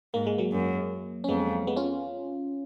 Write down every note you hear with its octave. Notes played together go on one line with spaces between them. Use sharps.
G#2 A#3
G#3
F#3 A#3
F#2
C#4
F2 G#3 B3
G#3 B3
C#4 F4